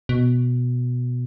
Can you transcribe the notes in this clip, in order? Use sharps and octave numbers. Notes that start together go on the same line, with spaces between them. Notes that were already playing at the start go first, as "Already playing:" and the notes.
B2